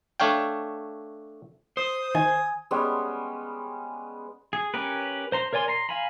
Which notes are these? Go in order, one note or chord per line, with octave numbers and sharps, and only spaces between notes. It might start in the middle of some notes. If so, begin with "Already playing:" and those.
A3 D4 C#5 F5 G5
C5 D#6
D#3 G#5
G3 G#3 B3 C#4
G#4
C#4 G4 A#4 B4
C5 A#5 C6
A#4 C#5 D5 G#5 C6
A#5 C6
F5 G#5 A#5 B5